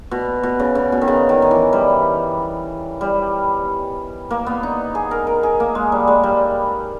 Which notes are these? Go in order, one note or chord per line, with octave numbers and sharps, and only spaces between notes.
B2
B2
C#3
C#3
B2
D#3
C#3
D#3
D#3
E3
G3
G3
A#3
B3
D#4
G#4
A#4
A#4
G#4
A#3
G#3
G3
G#3
G3